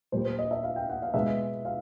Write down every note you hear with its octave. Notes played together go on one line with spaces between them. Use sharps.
A#2 G3 A#3 C5
C5
D#5
E5
F5
G5
F#5
F5
B2 G#3 B3 E5
F5